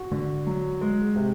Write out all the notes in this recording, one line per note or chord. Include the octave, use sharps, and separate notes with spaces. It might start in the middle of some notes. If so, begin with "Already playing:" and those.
Already playing: F#4
D3
F#3
G#3
C3